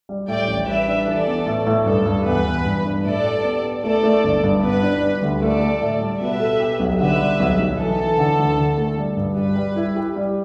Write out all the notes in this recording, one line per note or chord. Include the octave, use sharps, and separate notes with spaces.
G3
A2 D5 G5
A1
G3 B4 E5
D4
E3 A4 D5
B3
A2
A2
G2 A4
G2
E2 B4
E2
G2
D4
A2 A4 D5
G4
B3
B3
A3 A4 D5
A3
G1
G2
B3 B4
D4
G3
D2
A3 A4 D5
A3
A2
G3
B2 B4 E5
A4
G4
B1
D3 B4 E5
G3
B1
B1
E3 A4
E3
D3
D2
D3
A3
G3
G2
G3 B4
G3
E4
G4
G3